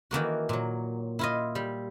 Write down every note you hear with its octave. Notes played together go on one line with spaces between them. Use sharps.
D#3 E3 A#3 F#4
A#2 F#3
E4 F4 D#5
G3